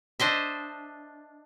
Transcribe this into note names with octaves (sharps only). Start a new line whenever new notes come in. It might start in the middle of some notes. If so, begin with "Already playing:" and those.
D4 C5 D#5 E5